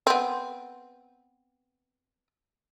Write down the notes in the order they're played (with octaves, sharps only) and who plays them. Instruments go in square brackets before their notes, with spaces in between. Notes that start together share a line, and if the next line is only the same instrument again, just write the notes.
[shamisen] B3 C4